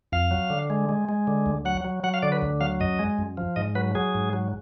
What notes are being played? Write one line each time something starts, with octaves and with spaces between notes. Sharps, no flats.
F2 F5
F#3
D3
G#3
G#3
G#3
D3
D2
F#3 F#5
F#3
F#3 F#5
F5
D3 D5
B4
D2
F#3 F5
F#2 D#5
G#3
F#2
F3
G#2 D#5
F#3 B4
F#3 G#4
G#2
F#3